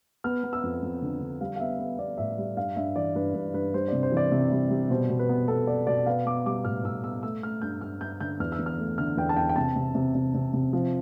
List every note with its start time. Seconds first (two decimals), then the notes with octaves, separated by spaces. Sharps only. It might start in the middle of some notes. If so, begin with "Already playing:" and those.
0.24 B3 F6
0.43 B3
0.53 E6
0.63 F2
0.82 F2
1.02 D3
1.20 D3
1.41 G3 F5
1.56 F5
1.60 B3 E5
1.79 B3
1.99 B3 D5
2.18 A2 E5
2.38 G3
2.57 G2 F5
2.76 G2 E5
2.96 E3 D5
3.15 G2 B4
3.34 G2 B4
3.54 G2 B4
3.74 G3 C5
3.88 C3 D5
4.03 C5
4.12 E3 D5
4.32 C3
4.52 G3
4.70 G3
4.90 B2 C5
5.10 B2
5.19 B4
5.29 B3
5.48 B3 A4
5.67 B3 D5
5.87 B2 D5
6.06 B3 F5
6.26 B3 D6
6.46 G3 D6
6.64 A2 F6
6.84 A2 E6
7.03 B3 E6
7.23 A3 E6
7.43 A3 F6
7.62 G2 G6
7.81 G2 F6
8.01 G2 G6
8.20 D3 G6
8.40 E2 F6
8.52 E6
8.59 E2
8.66 F6
8.78 A3
8.98 D3 F6
9.17 E2 G5
9.29 A5
9.36 E2 G5
9.49 G5
9.56 C3 A5
9.76 C3
9.95 C3
10.15 C3
10.34 C3
10.53 C3
10.73 F3